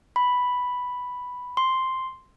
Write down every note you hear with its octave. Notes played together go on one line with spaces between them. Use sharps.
B5
C6